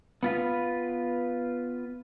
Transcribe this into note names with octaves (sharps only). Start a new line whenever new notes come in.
B3 F4 B4